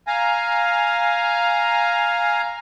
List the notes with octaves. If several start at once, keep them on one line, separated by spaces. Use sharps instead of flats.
F5 G#5 A#5